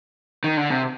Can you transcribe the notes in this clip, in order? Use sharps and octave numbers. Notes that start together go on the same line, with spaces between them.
D#3
D3
C3